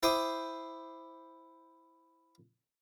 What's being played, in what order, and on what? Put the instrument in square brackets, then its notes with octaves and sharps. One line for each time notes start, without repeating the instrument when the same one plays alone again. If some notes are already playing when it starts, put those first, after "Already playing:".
[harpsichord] E4 C5 G5 D6 D#6